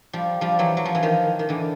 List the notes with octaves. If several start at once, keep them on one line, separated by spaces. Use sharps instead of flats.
F3 G3
F3 G3
E3 F#3
F#3
F3
E3
D#3 F3
D#3
D3 E3